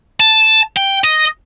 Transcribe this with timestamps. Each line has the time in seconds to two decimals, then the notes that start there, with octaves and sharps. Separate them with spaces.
0.20 A5
0.76 G5
1.04 D#5